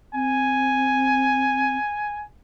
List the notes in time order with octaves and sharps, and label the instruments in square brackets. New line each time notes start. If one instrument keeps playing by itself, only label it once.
[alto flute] C4 [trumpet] G#5